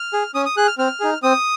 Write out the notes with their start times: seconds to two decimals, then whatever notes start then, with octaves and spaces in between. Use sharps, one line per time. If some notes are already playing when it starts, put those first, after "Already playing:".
Already playing: F6
0.13 G#4
0.35 C#4 D#6
0.46 D#6
0.57 G#4 F#6
0.68 F6
0.78 C4 F6
1.00 D#4 G#4
1.23 C4 D#6